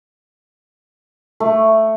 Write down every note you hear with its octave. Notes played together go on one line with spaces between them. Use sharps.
A3